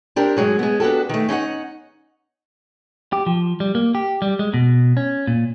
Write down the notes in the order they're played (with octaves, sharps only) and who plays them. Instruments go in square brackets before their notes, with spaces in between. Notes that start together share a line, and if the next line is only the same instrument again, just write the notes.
[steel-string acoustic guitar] C4 D4 G4 A#4
G#2 F#3 G#3
G#3 B3
B3 D4 F#4 G4 A4
D#3 A3
C#4 D#4 F5 F#5
[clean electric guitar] G4
F3
G3
A#3
G4
G3
G#3
B2
C#4
A#2